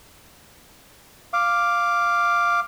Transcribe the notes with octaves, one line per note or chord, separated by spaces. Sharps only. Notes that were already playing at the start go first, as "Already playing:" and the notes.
F5 D6